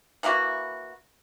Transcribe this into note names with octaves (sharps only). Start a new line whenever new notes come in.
E3 A#3 E4 F#4